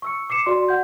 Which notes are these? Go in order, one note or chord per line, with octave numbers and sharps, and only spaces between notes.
C#6 E6 C#7
D6 C7 C#7 E7
F#4 D5 C6
F#5 G6